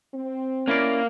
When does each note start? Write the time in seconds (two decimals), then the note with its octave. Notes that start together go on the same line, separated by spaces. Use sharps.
0.14 C4
0.68 A#3 C#4 E4 D5